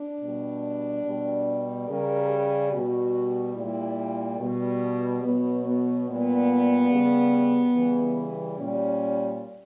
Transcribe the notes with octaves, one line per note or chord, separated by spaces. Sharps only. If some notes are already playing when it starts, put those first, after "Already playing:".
Already playing: D4
B2 G3
B2 G3
C#3 G3 A#4
G4
B2 G3 F#4
A#2 G3 E4
B2 G3
B2 F#3 B3
B3
A#2 G3 B3
C#3 G3
C#3 E3 G3
A#2 G3 C#4